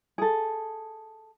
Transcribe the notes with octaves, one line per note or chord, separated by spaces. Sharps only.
G#4 A4